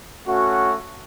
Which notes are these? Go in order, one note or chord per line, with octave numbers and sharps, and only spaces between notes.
A3 C#4 F#4